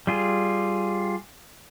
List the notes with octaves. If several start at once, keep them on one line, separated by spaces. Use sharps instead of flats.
G3 F4 G#4